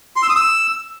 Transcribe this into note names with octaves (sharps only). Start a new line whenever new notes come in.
C6
E6
D#6
E6